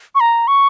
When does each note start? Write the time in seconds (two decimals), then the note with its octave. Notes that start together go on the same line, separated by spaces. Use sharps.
0.15 C#6
0.20 A#5
0.48 C#6